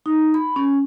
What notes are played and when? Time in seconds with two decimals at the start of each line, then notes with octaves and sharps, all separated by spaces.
0.06 D#4
0.34 B5
0.56 C#4